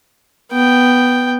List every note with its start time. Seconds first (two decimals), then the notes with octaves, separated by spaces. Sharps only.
0.52 B3 G5